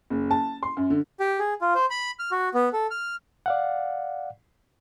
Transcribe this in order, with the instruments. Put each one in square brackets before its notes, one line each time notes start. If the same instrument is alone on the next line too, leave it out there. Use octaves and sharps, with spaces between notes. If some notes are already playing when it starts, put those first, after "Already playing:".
[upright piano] F#1
A5
C6
F#2
D3
[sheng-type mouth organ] G4
G#4
F4
C5
B5
F6
F#4
B3
A4
F6
[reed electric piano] D5 F5 F#5